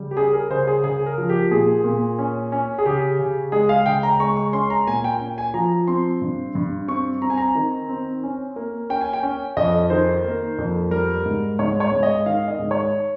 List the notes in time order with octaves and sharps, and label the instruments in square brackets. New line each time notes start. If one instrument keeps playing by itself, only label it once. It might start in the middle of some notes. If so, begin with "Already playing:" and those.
Already playing: [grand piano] C#3 G3
G4
C#4 G#4
A#4
C#3 C5
G#4
C#3 G#4
A#4
F3
G4
A#2 G#4
A#2
C#4
C#4
G#4
C#3 G4
C#3
G#3 G#4
F5
C#3 G5
A#5
G#3 C#6
C#6
C#4 C6
A#5
A#2 G#5
G5
C#4
G#5
F3 A#5
C4 C6
G2
G2
C4 C#6
C4 A#5
G#5
A#5
D#3
C4
C#4
A#3
C#4 G5
G#5
G5
C#4
F2 D#5
D#3 C5
A#3
F2
G3 A#4
G#2
G#2 C#5
C#5
G#2
D#5
D#3 F5
D#5
G#2
C#5